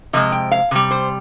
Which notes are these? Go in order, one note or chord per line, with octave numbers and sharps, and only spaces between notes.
C3 F3 G#3 D#5
G5
F5
C3 G3
C5